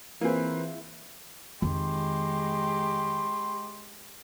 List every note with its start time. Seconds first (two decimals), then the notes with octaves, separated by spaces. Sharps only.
0.21 E3 A#3 C4 E4 F4 G#4 B4
1.62 F2 D#3 G#3 G4 C6